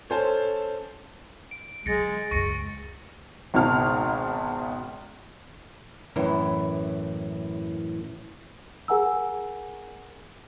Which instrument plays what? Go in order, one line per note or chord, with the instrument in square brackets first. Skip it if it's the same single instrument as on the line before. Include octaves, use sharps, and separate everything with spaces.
[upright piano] C#4 C5 A5 [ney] A4
[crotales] D7
[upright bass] D3 F#3 [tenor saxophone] G#3 [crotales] A6 A#6 C#7
[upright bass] C#2 F#2 [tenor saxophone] G#3 [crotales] C#6 A#6 C#7
[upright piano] G#1 C#2 B2 A5 F6
[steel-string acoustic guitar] F#2 A2 E3
[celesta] G#4 A#4 F#5 G#5 A#5 E6